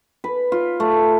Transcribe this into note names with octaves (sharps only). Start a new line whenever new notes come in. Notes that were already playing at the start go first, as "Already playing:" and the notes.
B4
F4
A3